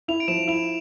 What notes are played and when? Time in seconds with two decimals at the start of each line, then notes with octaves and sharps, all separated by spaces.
0.08 E4 F7
0.20 D7
0.28 F3 E7
0.48 E4 F7